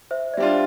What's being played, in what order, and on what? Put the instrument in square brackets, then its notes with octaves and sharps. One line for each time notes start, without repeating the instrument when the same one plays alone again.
[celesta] C5 E5
D5
[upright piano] G3 D4 F4 [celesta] C5 E5